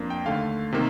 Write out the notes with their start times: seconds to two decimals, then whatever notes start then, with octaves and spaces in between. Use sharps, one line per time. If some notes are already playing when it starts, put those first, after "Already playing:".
Already playing: F2 A#3 D4
0.10 G5
0.26 D#2 D3 A3 F5
0.72 C3 D#3 A#3